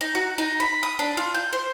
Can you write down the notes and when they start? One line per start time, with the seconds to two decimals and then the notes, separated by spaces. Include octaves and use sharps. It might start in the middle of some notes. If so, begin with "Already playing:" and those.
0.01 D#4
0.15 F#4
0.38 D#4
0.60 B5
0.83 D#6
0.99 D4
1.17 F4
1.34 G6
1.53 C5